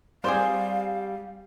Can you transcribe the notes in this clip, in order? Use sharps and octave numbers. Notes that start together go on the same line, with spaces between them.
G3 C4 F4 G4 G#4 C5 D5 F5